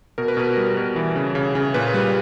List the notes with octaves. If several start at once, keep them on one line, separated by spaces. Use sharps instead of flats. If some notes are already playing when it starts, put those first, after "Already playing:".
B2 A#4
B4
B2 A#4
G3
B2
E3
C#3
C#3
C#3
A#2 B4
G3